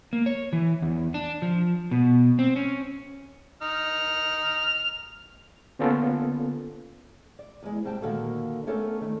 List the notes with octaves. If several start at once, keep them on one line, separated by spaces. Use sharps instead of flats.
A#3
C#5
E3
E2
D4
F3
B2
C4
C#4
D#4 F6
D3 A#3 B3 C#4 F4 A4
D5
E2 G#3
G#2 C3 G3 C4 G5 A5
A#2 D3 D#3 A#3 F#4 A4
A3 B3 C#4 D4 A4 A#4
D#3 A3